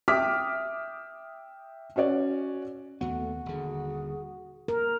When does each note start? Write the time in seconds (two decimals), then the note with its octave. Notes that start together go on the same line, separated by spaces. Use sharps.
0.08 E5 G5 D6 D#6 F6 B6
1.96 C#4 F#4 C#5 D5
3.01 D#2 A3 B3 F#4
3.46 D#1 D3 G#4
4.68 A#4